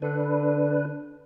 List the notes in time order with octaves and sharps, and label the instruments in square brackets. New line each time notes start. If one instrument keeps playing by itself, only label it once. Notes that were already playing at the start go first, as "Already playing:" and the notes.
[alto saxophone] D3 [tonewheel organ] D4 B4